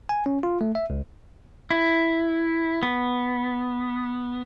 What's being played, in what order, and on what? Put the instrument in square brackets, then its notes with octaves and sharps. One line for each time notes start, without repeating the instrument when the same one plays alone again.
[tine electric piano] G#5
C#4
F4
A3
E5
C#2
[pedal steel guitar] E4
B3